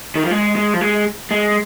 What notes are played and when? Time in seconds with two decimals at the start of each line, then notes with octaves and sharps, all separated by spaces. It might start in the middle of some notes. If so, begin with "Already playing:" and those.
0.15 D#3
0.24 F3
0.31 G#3
0.56 G#3
0.74 F3
0.81 G#3
1.31 G#3